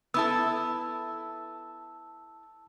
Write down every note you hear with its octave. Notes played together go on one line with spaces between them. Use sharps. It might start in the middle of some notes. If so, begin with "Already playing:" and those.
B3 E4 A4 A5 E6